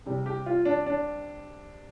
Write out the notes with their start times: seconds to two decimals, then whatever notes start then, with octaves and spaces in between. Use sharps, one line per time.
0.06 C3 G3
0.26 G4
0.46 F4
0.65 D4
0.86 D4